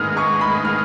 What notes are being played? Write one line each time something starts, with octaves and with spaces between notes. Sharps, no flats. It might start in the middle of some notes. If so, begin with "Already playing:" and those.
Already playing: G#2 D#3 G#3 B3 F6
C#6
B5
F6